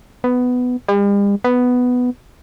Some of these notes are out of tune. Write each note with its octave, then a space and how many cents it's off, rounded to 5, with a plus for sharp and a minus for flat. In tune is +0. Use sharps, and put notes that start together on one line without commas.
B3 +10
G3 +45
B3 +5